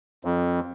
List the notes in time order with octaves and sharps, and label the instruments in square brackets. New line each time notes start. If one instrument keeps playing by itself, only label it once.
[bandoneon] F2